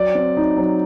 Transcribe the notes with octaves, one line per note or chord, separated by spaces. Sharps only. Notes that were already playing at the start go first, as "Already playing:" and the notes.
Already playing: F#3 D5
C4
D#4
F#3